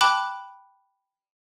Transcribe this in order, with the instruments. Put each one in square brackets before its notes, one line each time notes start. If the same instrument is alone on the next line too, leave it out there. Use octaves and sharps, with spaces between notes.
[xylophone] G5 A5 B5 D6 F#6